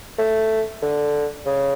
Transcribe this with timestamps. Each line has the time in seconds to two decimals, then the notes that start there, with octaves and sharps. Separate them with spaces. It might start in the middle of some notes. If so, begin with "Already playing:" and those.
0.18 A3
0.82 D3
1.46 C#3